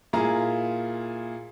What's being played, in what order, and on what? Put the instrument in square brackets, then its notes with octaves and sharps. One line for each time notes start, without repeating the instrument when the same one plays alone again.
[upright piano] A#2 E4 F4 G#4 A#5